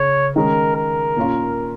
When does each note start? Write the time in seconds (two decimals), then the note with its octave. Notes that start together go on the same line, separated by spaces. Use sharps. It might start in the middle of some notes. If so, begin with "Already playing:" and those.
Already playing: C#3 C#5
0.36 D#3 G#3 C#4 A#4
0.76 A#4
1.17 A#2 A#3 C#4 F4